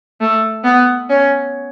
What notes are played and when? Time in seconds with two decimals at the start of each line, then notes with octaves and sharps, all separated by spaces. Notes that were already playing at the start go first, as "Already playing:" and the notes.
0.21 A3
0.64 B3
1.10 C#4